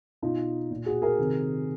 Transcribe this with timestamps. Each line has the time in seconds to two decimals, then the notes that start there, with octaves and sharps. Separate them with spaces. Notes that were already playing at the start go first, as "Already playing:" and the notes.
0.22 B2 D#4 F4
0.71 A#2
0.86 F#4 G#4
1.02 G#4 A#4
1.19 C3 D#3